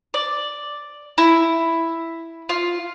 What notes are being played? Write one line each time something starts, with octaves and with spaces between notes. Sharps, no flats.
D5
E4
F4